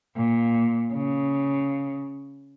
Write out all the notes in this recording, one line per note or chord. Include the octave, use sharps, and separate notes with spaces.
A#2
C#3